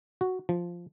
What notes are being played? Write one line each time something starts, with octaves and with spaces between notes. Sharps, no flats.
F#4
F3